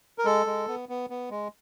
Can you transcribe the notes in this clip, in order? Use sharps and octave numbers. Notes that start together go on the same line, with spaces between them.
A#4
G#3 A4
G#3
B3
B3
B3
G#3